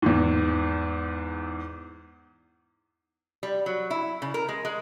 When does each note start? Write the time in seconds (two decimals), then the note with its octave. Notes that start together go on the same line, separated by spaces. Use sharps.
0.02 E2 G#2
3.43 G3
3.66 F#3
3.90 E4
4.22 C#3
4.34 A#4
4.49 G#3
4.65 G#3